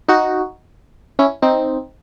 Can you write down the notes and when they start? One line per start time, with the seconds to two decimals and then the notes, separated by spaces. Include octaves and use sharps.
0.09 D#4 F#4
1.19 C#4 E4
1.42 C4 D#4